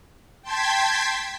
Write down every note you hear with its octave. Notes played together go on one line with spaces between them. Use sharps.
G5 A5 C6 G#6 B6